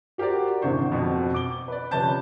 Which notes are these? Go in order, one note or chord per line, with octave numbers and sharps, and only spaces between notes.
F#4 G4 A#4 C5 D5
G#1 E2 C3 D4 C5 C#6
F2 B2
D6 G7
B4 D5
C3 F3 C#4 B4 A5 G6